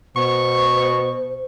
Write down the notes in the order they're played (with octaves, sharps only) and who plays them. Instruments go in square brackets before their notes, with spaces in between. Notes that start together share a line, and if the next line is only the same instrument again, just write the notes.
[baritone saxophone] B2 [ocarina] C5 [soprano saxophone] C#6